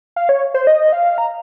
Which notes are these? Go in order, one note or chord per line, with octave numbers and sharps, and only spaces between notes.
F5
C#5
C5
D#5
F5
A#5